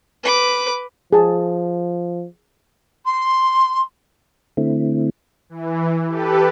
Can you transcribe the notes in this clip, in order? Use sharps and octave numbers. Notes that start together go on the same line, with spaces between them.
B4 D6
F3 G#4 A5
C6
D3 A3 C4 E4
E3
G4 A4 B4